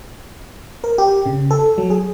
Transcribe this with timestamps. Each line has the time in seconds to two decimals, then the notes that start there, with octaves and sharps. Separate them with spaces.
0.84 A#4
0.98 G4
1.26 C#3
1.51 A4
1.78 F#3
1.90 G#4